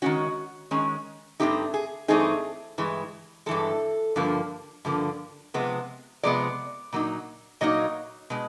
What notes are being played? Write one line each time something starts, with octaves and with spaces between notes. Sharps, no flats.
D#3 G#3 C#4 F#4
D#3 G#3 C#4
G2 E3 A3 C4 D#4 G4
G#4
G2 E3 A3 C4 D#4 G#4
G2 E3 G#3
G2 E3 G#3 A4
G2 D3 F3 A#3
G2 D3 F3 A#3
C3 F3 G#3 B3
C3 F3 G#3 B3 D5
A#2 F#3 A#3 D#4
A#2 F#3 A#3 D#4 D#5
B2 G#3